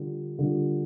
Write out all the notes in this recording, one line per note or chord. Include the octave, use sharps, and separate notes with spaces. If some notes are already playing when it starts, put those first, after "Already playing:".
Already playing: D3 G3 D4 F4
D3 G3 D4 F4